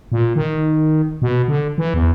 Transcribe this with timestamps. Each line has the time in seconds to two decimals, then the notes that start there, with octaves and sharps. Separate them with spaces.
0.12 A#2
0.36 D#3
1.22 B2
1.48 D3
1.78 E3
1.94 E2